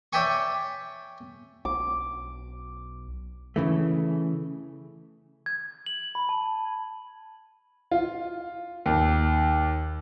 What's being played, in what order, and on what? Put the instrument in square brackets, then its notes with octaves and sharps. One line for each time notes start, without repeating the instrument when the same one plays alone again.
[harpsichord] C#5 D5 E5 G5 G#5 C#6
[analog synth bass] B1 [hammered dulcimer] D6
[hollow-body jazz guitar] C#3 E3 A3
[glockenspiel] G#6
F#7
B5
A5
[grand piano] F4
D#2